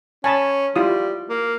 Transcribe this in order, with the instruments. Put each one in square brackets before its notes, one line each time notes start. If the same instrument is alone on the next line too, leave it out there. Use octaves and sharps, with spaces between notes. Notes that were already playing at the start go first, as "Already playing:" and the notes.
[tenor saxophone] C#4 [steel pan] G#5 A5 B5
[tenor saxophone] G3 [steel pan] E4 F4 D#6
[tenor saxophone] A#3